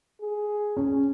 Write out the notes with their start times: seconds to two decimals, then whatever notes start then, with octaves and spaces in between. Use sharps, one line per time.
0.20 G#4
0.77 C#4